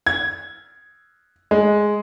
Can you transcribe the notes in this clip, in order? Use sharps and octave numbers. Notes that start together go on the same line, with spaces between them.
G#6
G#3